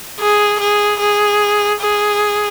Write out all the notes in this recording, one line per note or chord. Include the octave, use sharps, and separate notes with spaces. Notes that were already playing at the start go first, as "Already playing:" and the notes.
G#4
G#4
G#4
G#4